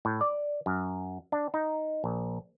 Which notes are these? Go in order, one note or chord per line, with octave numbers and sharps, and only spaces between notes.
A2
D5
F#2
D4
D#4
A#1